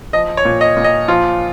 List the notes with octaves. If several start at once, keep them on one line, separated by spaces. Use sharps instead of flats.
F3 D#5
C#5
A#2
D#5
A#2
D#5
F3 F4